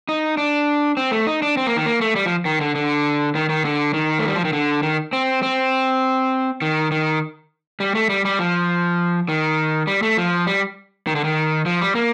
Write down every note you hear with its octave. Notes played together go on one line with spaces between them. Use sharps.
D#4
D4
C4
A3
D#4
D4
C4
A#3
D#3
A#3
A3
G3
F3
D#3
D3
D3
D#3
D#3
D3
D#3
A3
G3
F3
D#3
D3
D#3
C4
C4
D#3
D#3
G3
A3
G3
G3
F3
D#3
G3
A3
F3
G3
D#3
D3
D#3
F3
G3
A#3